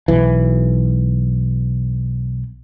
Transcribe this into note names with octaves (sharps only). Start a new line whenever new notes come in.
B1 E3